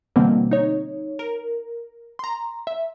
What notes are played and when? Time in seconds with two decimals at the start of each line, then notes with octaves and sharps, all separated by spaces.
0.16 B2 D3 E3 G3 A#3 C4
0.51 D#4 C#5
1.19 A#4
2.19 A#5 C6
2.67 E5